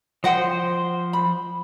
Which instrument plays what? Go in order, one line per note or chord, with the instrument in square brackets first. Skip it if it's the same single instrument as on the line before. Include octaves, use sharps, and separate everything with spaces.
[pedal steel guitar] F3 C5 [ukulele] D#5 F#5 G5
[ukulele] B5